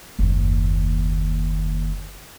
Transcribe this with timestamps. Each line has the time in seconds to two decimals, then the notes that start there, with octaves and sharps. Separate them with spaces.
0.19 F#1 D#2